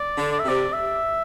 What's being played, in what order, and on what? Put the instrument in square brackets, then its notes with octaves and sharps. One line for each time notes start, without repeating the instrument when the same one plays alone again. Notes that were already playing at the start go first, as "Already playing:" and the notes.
Already playing: [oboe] D5
[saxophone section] D3
[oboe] D5
E5
[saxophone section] C3 [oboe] D5
[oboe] E5